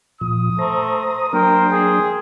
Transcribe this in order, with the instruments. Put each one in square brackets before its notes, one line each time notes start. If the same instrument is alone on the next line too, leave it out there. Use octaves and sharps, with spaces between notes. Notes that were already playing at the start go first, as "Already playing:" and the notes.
[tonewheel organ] A#2 F3 [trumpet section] D#6
[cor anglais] A3 [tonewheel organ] C5 A#5
[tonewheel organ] F#3 A#3 D4 [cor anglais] A#4 [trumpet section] C5 G5
[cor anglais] G#4